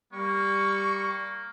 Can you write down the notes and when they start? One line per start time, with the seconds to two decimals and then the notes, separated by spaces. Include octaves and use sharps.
0.13 G3 A#3 C#6